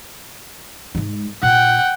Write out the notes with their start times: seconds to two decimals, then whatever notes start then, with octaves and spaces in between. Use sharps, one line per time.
0.95 G#2 G#3
1.43 A#2 F#5 G5